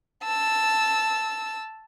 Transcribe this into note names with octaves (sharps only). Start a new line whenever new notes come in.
A5 E6